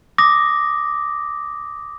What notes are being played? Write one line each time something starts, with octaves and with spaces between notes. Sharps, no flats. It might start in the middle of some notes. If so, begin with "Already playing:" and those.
D6 D#6 A#6